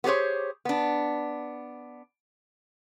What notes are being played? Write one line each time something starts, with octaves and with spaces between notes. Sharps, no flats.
B3 G4 G#4 C5 C#5
B3 D4